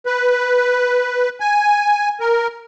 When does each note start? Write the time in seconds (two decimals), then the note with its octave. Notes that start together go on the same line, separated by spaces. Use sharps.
0.06 B4
1.40 G#5
2.20 A#4